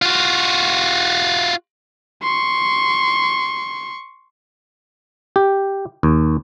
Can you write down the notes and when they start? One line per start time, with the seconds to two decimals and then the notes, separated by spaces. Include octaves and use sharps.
0.02 F4 F#4
2.23 C6 C#6
5.36 G4
6.03 D#2